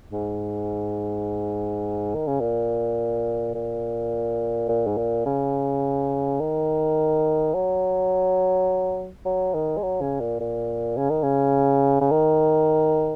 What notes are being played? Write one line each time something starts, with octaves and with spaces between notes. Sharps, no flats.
G#2
D#3
C#3
A#2
A#2
A#2
G#2
A#2
C#3
D#3
F#3
F#3
D#3
G#3
F#3
C#3
A#2
A#2
C#3
D#3
C#3
C#3
D#3